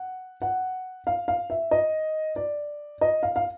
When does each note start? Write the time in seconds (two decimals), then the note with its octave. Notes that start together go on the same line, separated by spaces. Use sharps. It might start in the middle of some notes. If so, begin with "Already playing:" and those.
Already playing: F#5
0.42 F#5
1.07 F5
1.28 F5
1.50 E5
1.71 D#5
2.36 D5
3.01 D#5
3.23 F5
3.36 F5